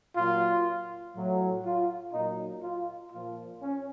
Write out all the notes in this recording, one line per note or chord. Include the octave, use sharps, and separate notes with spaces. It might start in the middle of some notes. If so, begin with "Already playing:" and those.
A#2 F#3 F4
A2 F#3
F4
A#2 F#3 D#4
F4
A#2 F3 F4
C#4